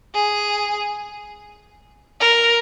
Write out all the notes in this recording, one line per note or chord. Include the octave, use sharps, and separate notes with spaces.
G#4
A#4